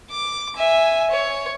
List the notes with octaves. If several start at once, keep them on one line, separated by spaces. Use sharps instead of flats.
D6
E5 G#5
C#5